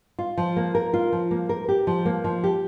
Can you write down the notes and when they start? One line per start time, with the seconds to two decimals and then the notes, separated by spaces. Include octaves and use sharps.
0.19 F4
0.38 F3
0.56 A#3
0.75 A#4
0.94 F4
1.12 F3
1.31 A#3
1.49 A#4
1.69 G4
1.87 F3
2.06 A#3
2.24 F3
2.44 G4